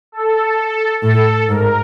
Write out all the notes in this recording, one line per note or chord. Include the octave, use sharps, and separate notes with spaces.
A4
A2 A4
G#2 A#4